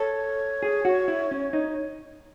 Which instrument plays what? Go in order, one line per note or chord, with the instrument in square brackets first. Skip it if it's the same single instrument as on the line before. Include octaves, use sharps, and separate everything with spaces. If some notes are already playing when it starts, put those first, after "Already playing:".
Already playing: [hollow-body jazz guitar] A4 [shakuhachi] C#5
[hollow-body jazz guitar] G#4
F#4
E4
C#4
D#4